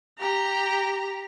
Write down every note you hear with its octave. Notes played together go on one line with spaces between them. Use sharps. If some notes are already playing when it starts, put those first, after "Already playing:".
G4 A#5